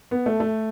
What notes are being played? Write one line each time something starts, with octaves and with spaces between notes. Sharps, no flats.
B3
A3
A3